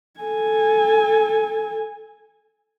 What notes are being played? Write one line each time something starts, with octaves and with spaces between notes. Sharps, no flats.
A4 G#5